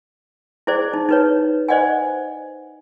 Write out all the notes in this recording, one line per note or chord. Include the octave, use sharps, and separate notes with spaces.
E4 G#4 C5 D5
D#4
D#4 B4 C#5
C5 D5 D#5 F#5 G#5